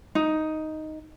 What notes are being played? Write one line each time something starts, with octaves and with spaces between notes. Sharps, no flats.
D#4